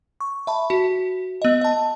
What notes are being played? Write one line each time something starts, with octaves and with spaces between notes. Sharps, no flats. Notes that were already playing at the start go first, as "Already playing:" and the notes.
C#6
E5 A5 B5
F#4
B3 D#5
D#5 A5